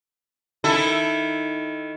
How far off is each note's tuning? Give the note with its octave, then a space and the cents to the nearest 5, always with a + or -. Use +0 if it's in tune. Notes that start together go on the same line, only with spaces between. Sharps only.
D#3 +0 E4 +0 A4 +5